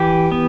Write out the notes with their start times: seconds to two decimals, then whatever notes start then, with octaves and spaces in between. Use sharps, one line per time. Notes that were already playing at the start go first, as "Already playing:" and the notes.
Already playing: E3 G4
0.32 B3